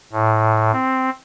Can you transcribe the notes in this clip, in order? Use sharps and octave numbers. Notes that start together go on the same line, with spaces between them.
A2
C4